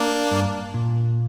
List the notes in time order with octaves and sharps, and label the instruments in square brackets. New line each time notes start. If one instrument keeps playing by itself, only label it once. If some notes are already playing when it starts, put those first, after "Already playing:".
Already playing: [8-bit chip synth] A#3 D4
[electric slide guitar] G2
A#2